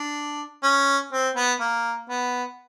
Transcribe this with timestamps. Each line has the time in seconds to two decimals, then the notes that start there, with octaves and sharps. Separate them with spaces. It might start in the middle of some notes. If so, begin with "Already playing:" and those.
Already playing: D4
0.63 C#4
1.12 C4
1.35 B3
1.60 A#3
2.09 B3